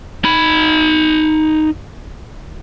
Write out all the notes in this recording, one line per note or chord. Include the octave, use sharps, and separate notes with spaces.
D#4 B5